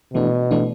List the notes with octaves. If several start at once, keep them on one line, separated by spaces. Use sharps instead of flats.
B2 E3 A3 D4
E3 A3 D4